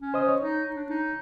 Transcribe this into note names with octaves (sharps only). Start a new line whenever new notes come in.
C#4
C5 D#5 D#6
C#5
D#4
D4
D#4